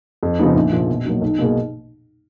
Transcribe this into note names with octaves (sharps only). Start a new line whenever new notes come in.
F2
C#3 F3 B3 D#4
A#1
A#2 F3
B2
F#3 A#3 D#4 F#4
B1
B2 A#3 D#4 G#4